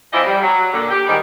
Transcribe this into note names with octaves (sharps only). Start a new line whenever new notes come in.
F2 E3 F3 E4 D5 D#5
G3
F#3
A#2 D3
G4
G#2 D#3 G3